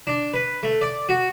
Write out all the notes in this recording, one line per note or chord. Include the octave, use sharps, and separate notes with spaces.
D4
B4
A3
D5
F#4